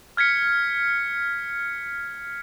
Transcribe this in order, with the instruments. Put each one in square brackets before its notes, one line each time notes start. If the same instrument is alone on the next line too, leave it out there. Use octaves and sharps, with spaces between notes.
[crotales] F6 G#6 B6 C#7